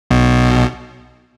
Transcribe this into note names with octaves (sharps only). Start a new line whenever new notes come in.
B1 B2